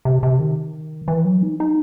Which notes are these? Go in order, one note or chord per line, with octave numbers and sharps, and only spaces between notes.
C3
C3
D#3
E3
F#3
D#4
D#4